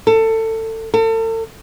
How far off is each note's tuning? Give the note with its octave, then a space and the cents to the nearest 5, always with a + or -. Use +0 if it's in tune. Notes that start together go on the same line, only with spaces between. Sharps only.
A4 +25
A4 +40